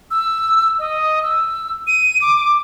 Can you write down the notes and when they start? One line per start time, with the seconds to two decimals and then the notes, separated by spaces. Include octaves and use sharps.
0.11 E6
0.79 D#5
1.23 E6
1.87 D#7
2.21 D6